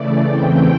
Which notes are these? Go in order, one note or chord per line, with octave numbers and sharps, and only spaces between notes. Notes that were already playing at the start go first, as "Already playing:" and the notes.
Already playing: C#3 E3 A3 D5
E2 C#3 E3 A3 C4 G5